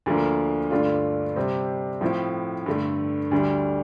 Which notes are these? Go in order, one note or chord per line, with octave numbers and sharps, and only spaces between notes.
D2 D3 F3 A#3
G2 D3 A3 D4 F4
C3 G3 C4
A2 F3 C4 E4
G2 D3 A3
D2 D3 G3